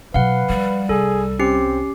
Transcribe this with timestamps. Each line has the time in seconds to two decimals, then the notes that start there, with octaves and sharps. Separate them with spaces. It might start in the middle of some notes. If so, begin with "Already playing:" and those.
0.14 B2 F#3 B4 F5 F#5
0.50 F3 G3 D#4
0.89 C2 G#4 A4
1.39 C4 C#4 G4 C7